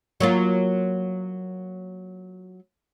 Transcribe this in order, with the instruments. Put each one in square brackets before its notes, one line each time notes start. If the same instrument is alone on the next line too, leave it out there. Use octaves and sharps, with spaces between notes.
[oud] F#3 A#3 F4